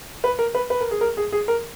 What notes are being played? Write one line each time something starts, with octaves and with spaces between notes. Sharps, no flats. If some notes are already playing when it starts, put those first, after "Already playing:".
B4
A#4
B4
B4
A#4
G#4
A#4
G#4
G#4
A#4